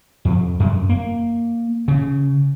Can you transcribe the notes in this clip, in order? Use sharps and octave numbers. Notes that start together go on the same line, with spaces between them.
F2
F#2
A#3
C#3